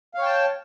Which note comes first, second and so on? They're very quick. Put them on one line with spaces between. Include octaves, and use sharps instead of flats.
F5 C#5 G5 A5